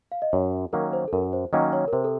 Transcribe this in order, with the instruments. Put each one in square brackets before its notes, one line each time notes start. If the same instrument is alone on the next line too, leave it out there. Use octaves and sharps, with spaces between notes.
[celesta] F5
D#5
[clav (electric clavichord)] F#2 [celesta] C#5
[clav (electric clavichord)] D#3 F#3 A#3 C#4 [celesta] A#4
[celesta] C5
A4
[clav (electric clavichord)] F#2 [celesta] A#4
[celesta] C5
[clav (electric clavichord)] D#3 F#3 A#3 C#4 [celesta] D#5
[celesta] C#5
A#4
[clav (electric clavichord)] C3 [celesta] C5
[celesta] A4